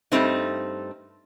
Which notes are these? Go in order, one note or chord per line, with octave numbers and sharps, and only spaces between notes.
G2 G3 A3 C4 D#4